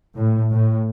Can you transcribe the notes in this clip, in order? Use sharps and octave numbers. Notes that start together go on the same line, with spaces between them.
A2
A2